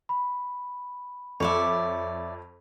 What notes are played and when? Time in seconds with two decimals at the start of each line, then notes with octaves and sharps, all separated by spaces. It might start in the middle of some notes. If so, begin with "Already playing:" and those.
0.09 B5
1.40 F2 C#5 D5 E5